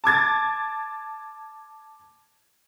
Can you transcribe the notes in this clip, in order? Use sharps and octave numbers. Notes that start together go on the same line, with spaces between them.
A5 D6 G#6 A6